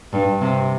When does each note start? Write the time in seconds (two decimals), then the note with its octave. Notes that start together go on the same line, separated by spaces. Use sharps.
0.13 G2
0.41 C3